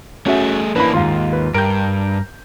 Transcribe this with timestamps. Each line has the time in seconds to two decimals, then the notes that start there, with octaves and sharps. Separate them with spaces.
0.26 A3 C#4 F#4 G#4 E5
0.76 A1 E3 A#3 D4 B4 B5
0.94 D#2 G#2 F4 F5 C6
1.33 B4
1.54 G2 A#4 G5 G6 D7